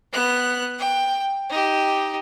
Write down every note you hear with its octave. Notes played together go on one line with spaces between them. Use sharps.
B3 F#6
G5
D#4 G4